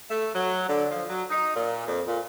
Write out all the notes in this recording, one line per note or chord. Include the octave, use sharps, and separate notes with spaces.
A3
F#3
D3
F3
F#3
D#4
A#2
F2
A#2